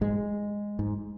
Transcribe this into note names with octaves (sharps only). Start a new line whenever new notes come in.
G#2 G#3
G#2